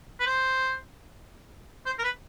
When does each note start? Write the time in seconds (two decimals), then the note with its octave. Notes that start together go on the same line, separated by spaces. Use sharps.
0.20 B4
0.26 C5
1.86 C5
1.99 A#4
2.04 B4